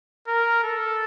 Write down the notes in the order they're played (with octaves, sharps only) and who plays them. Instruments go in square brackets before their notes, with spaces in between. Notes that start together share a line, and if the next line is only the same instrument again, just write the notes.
[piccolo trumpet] A#4
A4